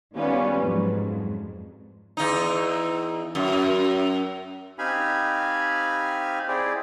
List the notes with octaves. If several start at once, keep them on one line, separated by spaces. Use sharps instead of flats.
D#3 G3 B3 C#4 F4 B4
F2 G#2 F#3
E2 D#4
F#2
C4 D#4 G4 F5 G#5 B5
C4 E4 G#4 C5 D5